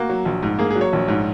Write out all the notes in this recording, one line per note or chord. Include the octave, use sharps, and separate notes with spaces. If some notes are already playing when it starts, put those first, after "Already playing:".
Already playing: A#3 F#4
F#3
A#1
G#2
A#3 G#4
G#4
F#3
C#5
A#1
G#2